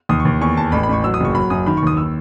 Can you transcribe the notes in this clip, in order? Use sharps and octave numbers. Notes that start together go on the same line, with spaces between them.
D#2 D#6
C#6
D#2
E2 C#6
E2 A5
A1 B5
B5
A1 C#6
F#3 E6
D#6
F#1 C#6
F#3 B5
F#2 D#6
D#3 B5
C#6
D#2 D#6
E6